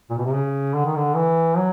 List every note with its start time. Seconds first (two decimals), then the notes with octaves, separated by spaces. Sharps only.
0.10 A#2
0.18 B2
0.25 C3
0.33 C#3
0.74 D3
0.85 D#3
0.96 D3
1.16 E3
1.57 F#3